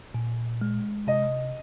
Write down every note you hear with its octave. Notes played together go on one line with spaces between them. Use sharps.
A#2
G#3
C3 D#5